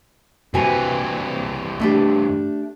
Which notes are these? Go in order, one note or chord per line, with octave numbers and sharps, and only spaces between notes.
G2 C3 E3 F#4 G#5
A3 D4 G4